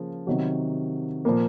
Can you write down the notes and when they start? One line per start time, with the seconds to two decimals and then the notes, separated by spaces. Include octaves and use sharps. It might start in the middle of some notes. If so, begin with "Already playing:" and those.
Already playing: C#3 F3 A#3
0.27 C3 D#3 F#3
1.25 A#2 F3 A#3